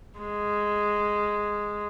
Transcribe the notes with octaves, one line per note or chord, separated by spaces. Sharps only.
G#3